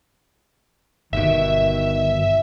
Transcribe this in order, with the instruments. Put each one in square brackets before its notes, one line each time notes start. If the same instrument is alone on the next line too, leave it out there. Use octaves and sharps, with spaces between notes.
[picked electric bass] G1 B2 [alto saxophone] D#3 [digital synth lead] E5